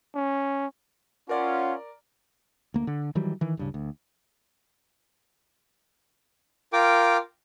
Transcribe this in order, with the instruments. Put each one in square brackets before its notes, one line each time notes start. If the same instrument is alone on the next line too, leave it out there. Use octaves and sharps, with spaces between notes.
[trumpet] C#4
[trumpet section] C#4 F4 [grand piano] A#4 D5 [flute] F#5
[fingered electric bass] D2 A#3
D3
D#3 E3 F#3 G3
D#3 E3
D1 G2 C#3
D2
[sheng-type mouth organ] F4 A#4 G5 D6